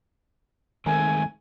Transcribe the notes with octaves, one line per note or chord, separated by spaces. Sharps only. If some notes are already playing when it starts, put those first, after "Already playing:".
D#3 G#3 A3 C4 G#5